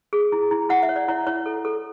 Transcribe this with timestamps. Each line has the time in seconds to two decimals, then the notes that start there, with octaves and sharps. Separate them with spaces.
0.13 G#4
0.32 E4
0.51 E4
0.69 E4 F#5
0.83 E5
0.89 C#5
0.96 D5
1.08 E4 C#5
1.27 E4 C#5
1.46 A4
1.65 A4